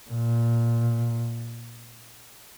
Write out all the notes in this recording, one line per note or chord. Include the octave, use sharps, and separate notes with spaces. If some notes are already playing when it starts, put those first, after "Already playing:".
A#2